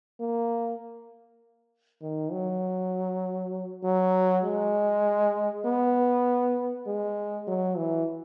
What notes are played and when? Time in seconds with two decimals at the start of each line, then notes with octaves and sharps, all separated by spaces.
0.20 A#3
2.01 D#3
2.32 F#3
3.84 F#3
4.44 G#3
5.65 B3
6.87 G#3
7.47 F#3
7.77 E3